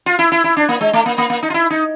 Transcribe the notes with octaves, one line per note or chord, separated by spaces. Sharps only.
F4
E4
E4
E4
D4
A#3
G#3
A3
A#3
A#3
A#3
D#4
F4
E4
D#4